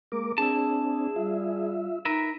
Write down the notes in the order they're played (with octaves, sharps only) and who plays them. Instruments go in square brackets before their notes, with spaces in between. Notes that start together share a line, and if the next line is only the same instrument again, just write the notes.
[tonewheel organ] G#3 A#4 D6 [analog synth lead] A#3
[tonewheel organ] C4 D4 [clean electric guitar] E4 A5 [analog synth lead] G#4
[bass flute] G3 [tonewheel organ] F4 E5
[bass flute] D#4 [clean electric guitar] A#4 B4 E5